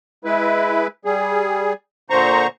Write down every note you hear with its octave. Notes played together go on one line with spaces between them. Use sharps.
G#3 E4 B4
G3 G#4
A#2 D3 C5 A#5 C#6